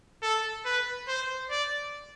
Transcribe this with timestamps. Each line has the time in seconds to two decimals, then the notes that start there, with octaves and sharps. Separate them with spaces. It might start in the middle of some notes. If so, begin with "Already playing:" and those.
0.22 A4
0.66 B4
1.08 C5
1.50 D5